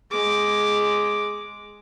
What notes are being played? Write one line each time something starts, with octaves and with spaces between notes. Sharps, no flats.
G#3 D6